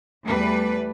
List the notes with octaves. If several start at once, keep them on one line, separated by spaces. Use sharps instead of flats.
E2 G3 A3 B4